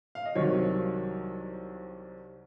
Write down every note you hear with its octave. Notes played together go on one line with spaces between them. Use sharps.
F5
D#5
C2 C3 D#3 F#3 C#5